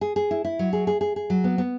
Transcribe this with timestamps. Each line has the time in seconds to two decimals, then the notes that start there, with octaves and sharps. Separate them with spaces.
0.01 G#4
0.16 G#4
0.31 E4
0.45 E4
0.59 F#3
0.73 G#4
0.87 G#4
1.01 G#4
1.16 G#4
1.30 F#3
1.44 B3
1.58 B3